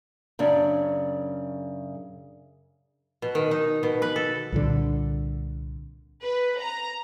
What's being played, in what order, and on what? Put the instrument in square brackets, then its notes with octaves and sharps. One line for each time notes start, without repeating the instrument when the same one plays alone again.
[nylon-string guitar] F#2 C#3 D4
[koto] B2
D#3
D#4
B2
B4
A4
[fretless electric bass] C2 A#2 D3
[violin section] B4
A#5